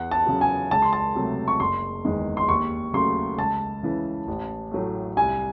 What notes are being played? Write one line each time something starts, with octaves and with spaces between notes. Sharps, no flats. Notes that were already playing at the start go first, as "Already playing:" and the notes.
Already playing: E2 F#5
A5
C#3 F#3
G#5
C#2 A5
C6
A5
C3 F#3 A3
C#6
F#1 C6
E2 D#3 G#3
C6
D#2 C#6
C#3 F#3 A3 C6
C#2 A5
C#3 E3
A1
A2 F#3 A3
C2 G#5